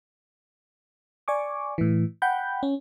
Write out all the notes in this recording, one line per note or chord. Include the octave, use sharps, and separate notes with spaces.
D5 G#5 C#6 D6
A2 E3
F#5 G5 B5 G6
C#4